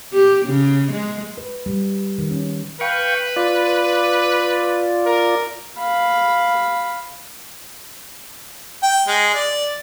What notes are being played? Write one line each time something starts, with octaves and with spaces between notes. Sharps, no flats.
G4
C#3
G#3
B4
G3
D#3
C#4
B4 F5 G5 C#6
F4 D5
A#4
F5 B5
G5
G#3
D5